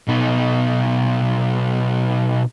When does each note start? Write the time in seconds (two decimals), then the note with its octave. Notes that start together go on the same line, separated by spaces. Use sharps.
0.08 B2 D#4